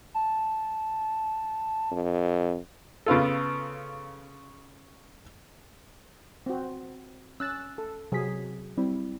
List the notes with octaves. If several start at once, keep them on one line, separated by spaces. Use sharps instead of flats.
A5
F2
C#3 B3 F4 A4
C4 F#4
C#4 E6 F#6 A6
A4
C3 F#3 G#4 B6
G3 C4 E4